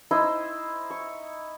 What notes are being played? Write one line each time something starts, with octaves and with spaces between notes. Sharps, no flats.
D#4 E4 C5 D#5
C#6